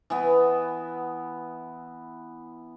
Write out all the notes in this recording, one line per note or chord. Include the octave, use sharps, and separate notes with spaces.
E3 B3